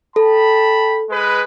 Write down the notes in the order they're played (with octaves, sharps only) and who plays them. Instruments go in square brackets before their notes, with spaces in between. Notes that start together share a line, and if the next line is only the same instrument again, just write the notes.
[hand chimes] A4 [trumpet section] G5 A5 B5
[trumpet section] G#3 B4